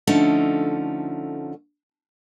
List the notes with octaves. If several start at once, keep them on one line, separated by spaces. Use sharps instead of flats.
D3 F3 A3 C#4 D#4